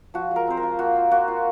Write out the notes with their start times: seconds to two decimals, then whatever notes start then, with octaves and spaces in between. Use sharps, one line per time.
0.14 F3 F#4
0.31 G#3 A#4
0.47 C4 C5
0.57 A#4
0.63 F4
0.79 A#3 F#4
0.96 F4
1.11 A#3 F#4
1.28 F4